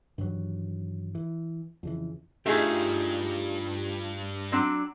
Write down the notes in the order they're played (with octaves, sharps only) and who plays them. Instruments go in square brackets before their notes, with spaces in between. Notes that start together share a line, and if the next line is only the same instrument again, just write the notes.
[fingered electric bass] G2 D#3 E3 F#3
E3
F2 C#3 E3
[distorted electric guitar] G2 [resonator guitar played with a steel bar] A3 D#4 G#4 [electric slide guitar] F4 G4
[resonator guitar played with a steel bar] F#3 C4 D4